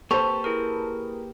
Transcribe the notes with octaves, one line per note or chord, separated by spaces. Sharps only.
A#3 G4 A4 B4 C5 C#6 F7
E4 G#4 A#4